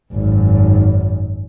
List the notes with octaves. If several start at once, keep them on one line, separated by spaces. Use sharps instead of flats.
G#1 F#2